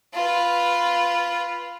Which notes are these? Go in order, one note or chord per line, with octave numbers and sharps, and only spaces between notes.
F4 B4